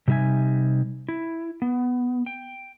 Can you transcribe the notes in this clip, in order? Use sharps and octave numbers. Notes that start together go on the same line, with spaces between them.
C3 G3 D#4 E5 G#5
E4
B3
G5